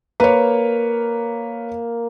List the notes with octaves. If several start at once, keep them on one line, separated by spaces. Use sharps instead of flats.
A#3 B4 C#5